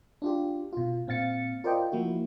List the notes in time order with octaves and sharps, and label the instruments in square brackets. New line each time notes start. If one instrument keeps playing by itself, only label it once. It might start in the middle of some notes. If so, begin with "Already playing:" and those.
[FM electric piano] D4 F4 G4
B2 F4
A#2 C4 F5 A6 C#7
F4 A#4 C5 D5 D#5 G5
F3 A#3 E4 F#4